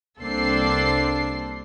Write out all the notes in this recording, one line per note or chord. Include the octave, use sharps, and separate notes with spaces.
C2 A#3 C4 D4 A4 C7